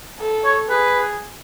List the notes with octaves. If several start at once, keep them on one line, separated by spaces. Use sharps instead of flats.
A4
C#5
G#4 B4